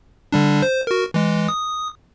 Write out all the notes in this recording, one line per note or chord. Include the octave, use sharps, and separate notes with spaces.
D3 G3 D4
C5
F#4 A#4
E3 G#3
D#6